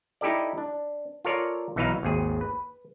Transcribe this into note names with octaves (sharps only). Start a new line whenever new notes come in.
D#4 E4 G4 A4 D5
D4
F4 A4 A#4 C#5 D5
B1 E3 D#4 F#4 B4 F5
G#1 D#2 G#4
B4